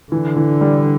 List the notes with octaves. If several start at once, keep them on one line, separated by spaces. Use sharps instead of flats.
D3 E3
E3
G3